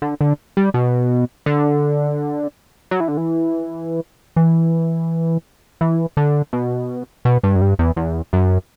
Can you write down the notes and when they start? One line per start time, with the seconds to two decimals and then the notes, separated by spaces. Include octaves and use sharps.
0.02 D3
0.21 D3
0.57 G3
0.74 B2
1.46 D3
2.91 F#3
3.00 E3
3.08 D3
3.17 E3
4.36 E3
5.81 E3
6.17 D3
6.53 B2
7.25 B2
7.43 G2
7.55 F#2
7.61 G2
7.79 E2
7.96 E2
8.33 F#2